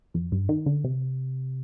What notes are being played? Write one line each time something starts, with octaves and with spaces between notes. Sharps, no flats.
F2
G2
D#3
D3
C3